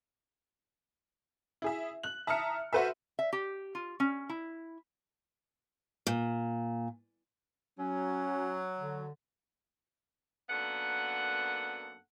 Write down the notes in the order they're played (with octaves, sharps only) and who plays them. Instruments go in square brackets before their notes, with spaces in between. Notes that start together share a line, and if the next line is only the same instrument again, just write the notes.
[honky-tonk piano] E4 G#4 E5
F#6 F#7
E5 A5 A#5 D#6 F6 C#7
F#4 A4 B4 C5 E5
[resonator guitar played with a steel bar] E5
G4
F4
C#4
E4
[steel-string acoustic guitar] A#2
[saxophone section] F#3 [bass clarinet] C#4
[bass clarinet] D3
[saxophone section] F#2 A#3 B3 D4 A4 F#5